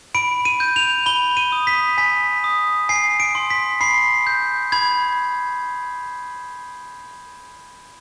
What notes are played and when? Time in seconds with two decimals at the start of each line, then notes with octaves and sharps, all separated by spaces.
0.15 B5 D7
0.45 D#7
0.60 G6
0.76 F7
1.06 B5 G7
1.37 D#7
1.52 D#6
1.67 B6
1.97 G#5 B6
2.44 D#6
2.89 G#5 C7
3.20 D7
3.35 C6
3.50 B6
3.80 B5 C7
4.27 G6
4.72 B5 G#6